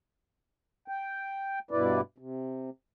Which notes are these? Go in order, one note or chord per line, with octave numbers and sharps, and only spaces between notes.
G5
G2 B2 E4 B4 D5
C3